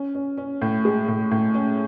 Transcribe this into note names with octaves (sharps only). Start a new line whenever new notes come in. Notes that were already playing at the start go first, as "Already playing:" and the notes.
Already playing: C#4
C#4
C#4
A2
G#3
A2
A2
C#4